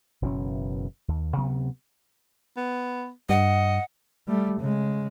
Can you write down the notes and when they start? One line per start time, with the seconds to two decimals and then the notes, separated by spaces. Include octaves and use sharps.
0.22 F#1 B2 E3 C#4
1.08 D#2
1.37 D2 C3 F#3 B3
2.57 B3
3.29 G2 D#5 F#5
4.28 G3 A3
4.60 C#3 G#3